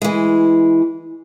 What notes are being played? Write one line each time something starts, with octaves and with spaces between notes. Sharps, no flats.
E3 G#3